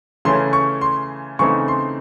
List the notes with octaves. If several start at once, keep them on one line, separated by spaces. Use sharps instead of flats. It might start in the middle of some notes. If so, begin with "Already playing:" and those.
C#3 E3 A3 C#4 C6
C#6
C6
C#3 E3 A3 C4 D#4 C#6
C6